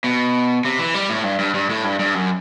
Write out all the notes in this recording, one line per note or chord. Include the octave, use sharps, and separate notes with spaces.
B2
C3
E3
G3
A2
G2
G2
G2
A2
G2
G2
F#2